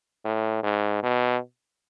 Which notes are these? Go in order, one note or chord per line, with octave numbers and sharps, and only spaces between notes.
A2
G#2
B2